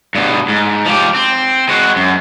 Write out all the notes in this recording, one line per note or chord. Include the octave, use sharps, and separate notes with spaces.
G2 B2
G#2
F3 G4
C4
G#3 F#4
F#2